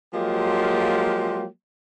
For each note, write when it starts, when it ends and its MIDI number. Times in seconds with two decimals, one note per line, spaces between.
0.14 1.46 53
0.14 1.46 54
0.14 1.46 56
0.14 1.46 58
0.14 1.46 65
0.14 1.46 67